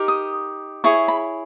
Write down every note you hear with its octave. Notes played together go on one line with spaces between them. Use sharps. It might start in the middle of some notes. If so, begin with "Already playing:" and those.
Already playing: D#4 G4 A#4
D#6
E4 G#4 C#5 C#6
B5